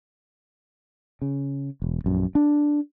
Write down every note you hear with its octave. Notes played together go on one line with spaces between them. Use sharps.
C#3
E1
A#1 F#2
D4